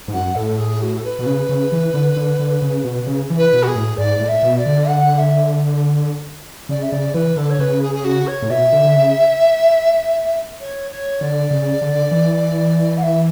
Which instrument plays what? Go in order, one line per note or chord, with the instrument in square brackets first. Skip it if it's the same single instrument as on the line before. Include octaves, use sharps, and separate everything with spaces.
[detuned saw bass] G#2
[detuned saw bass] F#2 [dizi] F#5
[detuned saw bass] A2 [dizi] A4
[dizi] G#4
F#4
A4
B4
[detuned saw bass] B2
C#3
C#3
E3
D3
D3
D3
C#3
B2
C#3
E3
[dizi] B4
[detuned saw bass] B2
[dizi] F#4
G#4
[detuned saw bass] A2
[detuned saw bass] G#2 [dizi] D5
[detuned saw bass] A2
[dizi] E5
[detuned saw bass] B2
[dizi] D5
[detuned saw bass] D3
[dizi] F#5
E5
[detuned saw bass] C#3 [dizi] D5
[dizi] E5
[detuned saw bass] C#3 [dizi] D5
[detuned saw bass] E3 [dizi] B4
[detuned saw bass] D3 [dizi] A4
[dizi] C#5
[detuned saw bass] C#3 [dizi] B4
[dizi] G#4
G#4
F#4
C#5
[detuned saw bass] A2
[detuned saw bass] B2 [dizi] E5
[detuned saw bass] D3
D3
C#3
[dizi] C#5
C#5
[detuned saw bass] D3 [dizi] D5
[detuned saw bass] C#3
D3
E3
[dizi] F#5
E5